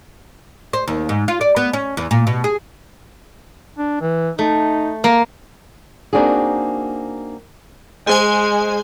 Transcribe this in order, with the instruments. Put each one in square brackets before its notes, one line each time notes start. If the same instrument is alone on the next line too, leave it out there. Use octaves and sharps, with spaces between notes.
[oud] C5
D#2
G#2
F4
D5
B3
C#4
E2
A#2
B2
G#4
[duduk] D4
E3
[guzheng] A3 [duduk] D#4
[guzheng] A#3
[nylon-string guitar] A#3 C4 D4 D#4 F#4 G#4
[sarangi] G#3 [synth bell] G#4 C5 G#5